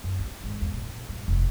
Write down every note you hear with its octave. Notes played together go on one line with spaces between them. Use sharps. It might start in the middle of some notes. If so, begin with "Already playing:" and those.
F#2
E4
G#1
E2
A#2
G2
F1